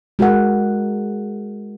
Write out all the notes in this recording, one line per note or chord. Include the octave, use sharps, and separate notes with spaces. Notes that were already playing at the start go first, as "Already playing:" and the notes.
G#3 F#4 G#4 A#4 F#5